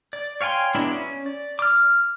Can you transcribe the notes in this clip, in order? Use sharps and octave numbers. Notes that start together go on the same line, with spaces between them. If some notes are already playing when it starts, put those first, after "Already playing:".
D5
C#5 F5 G5 G#5 C6
F#3 G#3 B3 D4 E4
C#4
D5
D6 F6